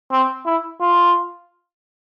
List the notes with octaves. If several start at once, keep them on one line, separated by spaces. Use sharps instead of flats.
C4
E4
F4